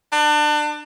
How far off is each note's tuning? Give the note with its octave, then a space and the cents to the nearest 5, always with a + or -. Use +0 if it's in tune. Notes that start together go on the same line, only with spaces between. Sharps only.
D4 +30